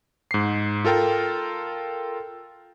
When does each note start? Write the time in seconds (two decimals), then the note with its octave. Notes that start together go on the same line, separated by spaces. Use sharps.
0.31 G#2 C7
0.85 F4 A4 A#4 G5